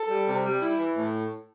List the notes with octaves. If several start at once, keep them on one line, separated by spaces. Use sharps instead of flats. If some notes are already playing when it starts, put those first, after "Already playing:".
Already playing: A4
G3
C3
G3
E4
E3
A2